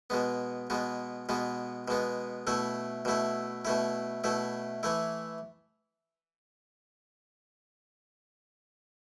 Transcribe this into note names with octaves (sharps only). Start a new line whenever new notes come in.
B2 G#3 B3
B2 G#3 B3
B2 G#3 B3
B2 G#3 B3
B2 A3 E4
B2 A3 E4
B2 A3 E4
B2 A3 E4
E3 A3 E4